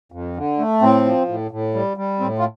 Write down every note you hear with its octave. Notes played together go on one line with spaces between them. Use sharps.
F2
D3
A3
A2 C4
F3
A2
A2
G3
G3
A2 C4
F4